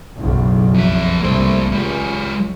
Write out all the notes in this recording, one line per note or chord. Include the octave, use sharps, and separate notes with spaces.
F#1 B1 E2
F2 E5
C2 E3 A3 A#3 C5
C#2 G#3 G4